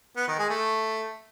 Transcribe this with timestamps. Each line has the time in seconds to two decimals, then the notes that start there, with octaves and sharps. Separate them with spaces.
0.17 B3
0.28 D#3
0.39 G#3
0.49 A3